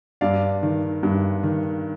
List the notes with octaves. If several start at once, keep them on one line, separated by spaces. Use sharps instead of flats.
G2 D5 F5
D#3
G2
D#3